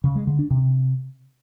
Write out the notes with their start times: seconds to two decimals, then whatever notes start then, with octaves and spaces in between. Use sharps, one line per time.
0.04 C#3
0.15 G#3
0.27 D3
0.39 D4
0.50 C3